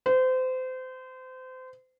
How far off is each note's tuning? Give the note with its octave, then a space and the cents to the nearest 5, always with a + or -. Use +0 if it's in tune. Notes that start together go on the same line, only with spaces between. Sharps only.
C5 -30